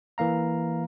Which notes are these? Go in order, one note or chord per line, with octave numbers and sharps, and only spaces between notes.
E3 A#3 F5 A#5